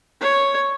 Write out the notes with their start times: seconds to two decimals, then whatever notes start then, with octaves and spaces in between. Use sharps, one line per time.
0.21 C#5